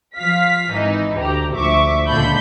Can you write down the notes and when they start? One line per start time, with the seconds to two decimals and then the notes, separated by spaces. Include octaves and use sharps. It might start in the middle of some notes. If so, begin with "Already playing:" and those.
0.17 F3 F5 B6
0.72 G#1 E3 D#4
1.18 D2 G4 A#5
1.55 D2 F3 E5 C#6 D6
2.08 C#2 A#2 D3 A5 B5 G6